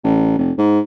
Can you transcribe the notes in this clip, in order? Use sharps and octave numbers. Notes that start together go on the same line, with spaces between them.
A1
F1
G#2